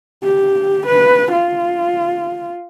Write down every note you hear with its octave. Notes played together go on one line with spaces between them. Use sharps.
G4
B4
F4